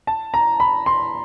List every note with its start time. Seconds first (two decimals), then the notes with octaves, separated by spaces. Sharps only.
0.07 A5
0.34 A#5
0.60 B5
0.86 C6